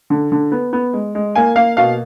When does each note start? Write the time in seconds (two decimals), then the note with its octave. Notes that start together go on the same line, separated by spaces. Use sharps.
0.10 D3
0.32 D3
0.52 B3
0.73 B3
0.93 G#3
1.15 G#3
1.36 A#3 G#5
1.56 A#3 F5
1.77 B2 F5